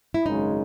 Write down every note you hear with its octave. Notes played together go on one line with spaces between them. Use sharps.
E4
G#1 F#2 C#3 G#3 D#4